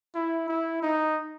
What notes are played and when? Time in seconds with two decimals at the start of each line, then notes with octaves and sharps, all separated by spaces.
0.15 E4
0.49 E4
0.83 D#4